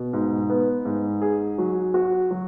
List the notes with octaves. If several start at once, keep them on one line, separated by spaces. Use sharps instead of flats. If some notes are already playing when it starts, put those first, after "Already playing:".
Already playing: B2
G#2
B3
G#2
G#4
F#3
F#4
F#3